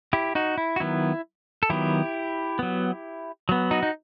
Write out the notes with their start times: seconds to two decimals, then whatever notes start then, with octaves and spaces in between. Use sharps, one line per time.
0.13 E4 G4
0.35 D#4 F#4
0.58 E4
0.76 F#4
0.80 D#3 F#3 B3 E4
1.63 A4
1.70 D#3 F#3 B3 E4 G4
2.59 F#3 B3
3.49 F#3 B3
3.71 D#4 F#4
3.83 D#4